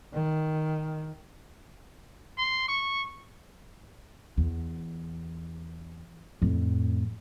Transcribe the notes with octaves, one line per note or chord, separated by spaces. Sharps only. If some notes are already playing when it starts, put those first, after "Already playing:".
D#3
C6
C#6
E2
F2 A2